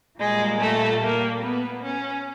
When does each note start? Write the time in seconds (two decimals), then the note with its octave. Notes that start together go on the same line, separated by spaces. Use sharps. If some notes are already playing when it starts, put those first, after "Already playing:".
0.19 A#2 G3 G#3
0.60 A3
1.01 A#3
1.41 B3
1.82 C#4